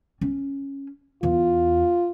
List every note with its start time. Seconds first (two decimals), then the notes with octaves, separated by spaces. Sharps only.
0.21 C#4
1.23 E2 F4